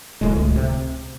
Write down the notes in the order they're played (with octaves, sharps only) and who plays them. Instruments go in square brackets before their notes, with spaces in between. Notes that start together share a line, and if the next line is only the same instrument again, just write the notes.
[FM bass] D1 [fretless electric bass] D2 A2 G#3
[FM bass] C#2
[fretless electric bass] C3